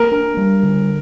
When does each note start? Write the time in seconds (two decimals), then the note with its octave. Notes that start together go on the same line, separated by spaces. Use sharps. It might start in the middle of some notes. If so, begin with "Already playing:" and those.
Already playing: A#3 A#4
0.12 D4
0.37 G3
0.63 D3